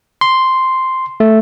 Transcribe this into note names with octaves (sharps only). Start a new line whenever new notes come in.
C6
A3